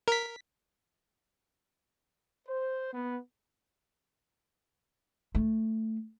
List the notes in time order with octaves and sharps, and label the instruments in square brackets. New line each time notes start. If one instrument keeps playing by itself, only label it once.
[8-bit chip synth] A#4 B6
[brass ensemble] C5
B3
[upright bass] A3